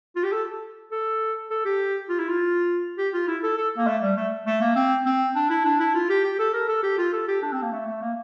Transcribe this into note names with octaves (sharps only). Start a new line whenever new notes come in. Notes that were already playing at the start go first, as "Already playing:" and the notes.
F4
G4
A4
A4
A4
G4
F4
E4
F4
G4
F4
E4
A4
A4
A#3
A3
G3
A3
A3
A#3
C4
C4
D4
E4
D4
E4
F4
G4
G4
A4
A#4
A4
G4
F4
A4
G4
D4
C4
A#3
A3
A3
A#3